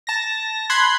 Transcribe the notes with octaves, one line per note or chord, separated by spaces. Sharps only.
A5 A#6
B5 C6 F#6 G#6 C7